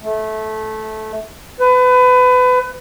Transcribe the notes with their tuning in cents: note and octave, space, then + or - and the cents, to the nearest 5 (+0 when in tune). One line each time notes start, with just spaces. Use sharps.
A3 -15
B4 +30